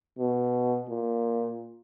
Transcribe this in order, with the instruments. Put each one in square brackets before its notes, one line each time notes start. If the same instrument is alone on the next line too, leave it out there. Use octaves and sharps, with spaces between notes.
[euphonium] B2
A#2